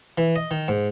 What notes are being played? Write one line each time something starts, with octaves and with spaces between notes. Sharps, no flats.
E3
D#5
D#3
G#2